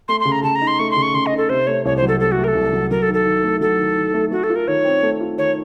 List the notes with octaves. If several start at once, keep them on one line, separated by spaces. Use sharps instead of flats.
A3 C6
C6
C#3
A#5
C#3 A5
A#5
D#4
C6
A3 C#6
C6
C#3
C#6
C#3 C6
D#5
D#4
A4
C3 C5
A3 C#5
C2 C#5
C5
F#3
A4
C3 A4
F#4
A3
A#4
A4
C2
F#3
F#3 A#4
A4
D#3
A4
D#3
A3
F#3 A4
D#3
D#3
A3
A3 F#4
A4
F4
A#4
D#3 C#5
C4
A3
F4
D#3 C#5